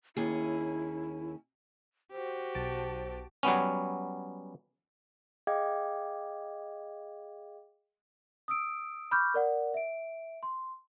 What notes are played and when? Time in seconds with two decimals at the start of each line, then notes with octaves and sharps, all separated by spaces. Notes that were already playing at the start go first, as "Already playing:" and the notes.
0.17 D#2 C#4 E4 G#4
2.12 F#4 G4 C5
2.55 B1 A5 D7
3.43 F#3 G3 B3 C#4
5.47 G#4 D#5 F5 G5 D6 G#6
8.48 D#6 E6 D7
9.11 B5 C#6 D6 F6 G6
9.34 A#4 D5 F#5
9.74 E5 D7
10.43 C6